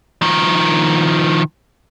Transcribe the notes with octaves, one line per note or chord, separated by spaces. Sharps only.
D#3 F3